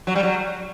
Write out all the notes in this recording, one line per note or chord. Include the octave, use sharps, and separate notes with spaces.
F#3
G3
F#3